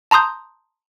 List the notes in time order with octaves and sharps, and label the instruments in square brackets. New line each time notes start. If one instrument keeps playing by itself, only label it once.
[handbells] A5 A#5 C6 D#6 G6